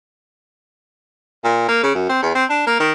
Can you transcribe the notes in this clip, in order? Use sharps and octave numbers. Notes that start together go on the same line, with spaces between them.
A#2
A#3
C#3
F#2
C4
E2
C4
D4
A#3
D#3